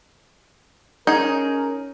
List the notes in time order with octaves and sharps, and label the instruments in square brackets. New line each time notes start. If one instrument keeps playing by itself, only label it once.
[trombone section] C#4 A#4 [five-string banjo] D#4 G#4